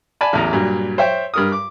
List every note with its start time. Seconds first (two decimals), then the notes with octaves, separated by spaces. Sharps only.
0.21 D5 G#5 A5 B5
0.33 A1 E2 A#5
0.53 G2 A#2 F#3
0.98 C5 C#5 E5 G5
1.34 G2 A#4 D#6
1.52 D6